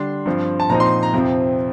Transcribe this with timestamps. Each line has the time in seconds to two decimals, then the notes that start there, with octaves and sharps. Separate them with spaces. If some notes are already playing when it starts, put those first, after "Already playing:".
Already playing: D3 G3 D4 C6
0.26 G2 F3 C4
0.60 A5
0.70 A#2 F3 C4 D#4 A#5
0.80 C6
1.03 A#5
1.14 F2 C3 F3 C4